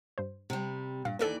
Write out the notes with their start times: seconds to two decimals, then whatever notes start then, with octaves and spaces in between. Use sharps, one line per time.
0.18 G2 C5
0.50 C3 G3
1.05 G2 A#2 F5
1.19 D#2 E3 A#3 A4 D5